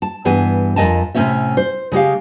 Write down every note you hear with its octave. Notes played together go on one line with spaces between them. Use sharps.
A5
G2 E3 B3 G#4 G#5
F2 C3 A#4 D#5 G#5 A5
A2 C3 C4 C#4 C#5 E5
C5
C#3 G#3 G4 F5